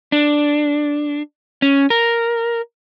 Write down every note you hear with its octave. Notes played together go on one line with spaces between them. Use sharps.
D4
C#4
A#4